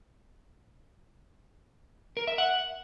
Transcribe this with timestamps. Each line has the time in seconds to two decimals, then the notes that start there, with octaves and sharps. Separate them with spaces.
2.17 A#4
2.27 E5
2.38 F#5